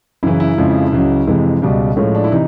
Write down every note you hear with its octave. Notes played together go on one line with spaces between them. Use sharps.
F#2 C#3 E3 E4
E4
F2 C#3 F3 G#3
C#2 C#3 F#3
F2 C3 E3 G#3
C#2 B2 G3
A2 F3 G#3 C#4
D4
E4
C3 E3 D#4